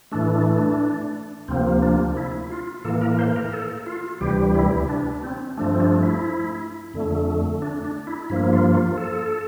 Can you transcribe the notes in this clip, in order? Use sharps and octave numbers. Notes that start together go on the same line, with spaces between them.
A2 E3 A3 D4
D4
D4
D2 C3 F3 A#3 C4
D4
E4
F4
A2 E3 A#3 A4
A#4
C5
A#4
A4
F4
D2 C3 E3 G3 G4
E4
D4
C4
G2 F3 A3 D4
C4
D4
E4
F2 D3 A3
D4
D4
E4
G2 F3 A#3 E4
F4
F4
A4